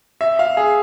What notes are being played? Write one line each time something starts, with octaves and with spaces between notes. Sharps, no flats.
E5
F5
G#4